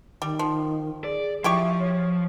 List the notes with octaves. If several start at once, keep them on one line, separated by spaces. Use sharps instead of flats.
D#3 G3
F3
G#4 D5
F3 E4 G4 E5 C#6
C#5